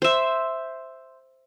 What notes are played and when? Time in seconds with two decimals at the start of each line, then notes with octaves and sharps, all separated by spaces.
0.02 C5 E5